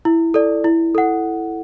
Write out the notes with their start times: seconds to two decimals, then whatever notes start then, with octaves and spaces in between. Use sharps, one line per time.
0.05 E4
0.34 A4 D5
0.64 E4
0.95 A4 F#5